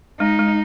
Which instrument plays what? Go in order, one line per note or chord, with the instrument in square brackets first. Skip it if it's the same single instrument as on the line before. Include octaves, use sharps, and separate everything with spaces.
[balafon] G#3 [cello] D#4
[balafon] G#3